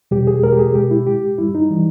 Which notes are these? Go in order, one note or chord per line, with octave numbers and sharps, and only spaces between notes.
E2 B2 G3 G4
G#4
E2 B2 G#3 A#4
G4
G#4
B2 G#3 G4
E4
A#2 G#3 G4
G2 G3 E4
D#4
E3 G3